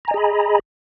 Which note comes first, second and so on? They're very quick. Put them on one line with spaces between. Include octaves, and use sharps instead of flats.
A#5 G#5 D#5 G#4 B5